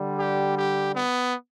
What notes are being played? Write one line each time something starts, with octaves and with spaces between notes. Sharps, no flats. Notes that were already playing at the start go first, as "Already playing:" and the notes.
Already playing: D3 G3
G4
G4
B3